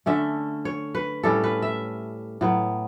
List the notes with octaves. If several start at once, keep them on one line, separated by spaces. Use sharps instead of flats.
D3 A3 C#4 E5
C#5
B4
A2 G3 C#4 A4
B4
E5
A2 F#3 B3